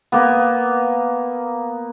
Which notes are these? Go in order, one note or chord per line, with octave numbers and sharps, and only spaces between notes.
A#3 B3